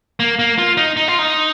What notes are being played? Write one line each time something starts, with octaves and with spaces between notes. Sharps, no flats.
A#3
A#3
F4
D#4
D#4
F4
D#4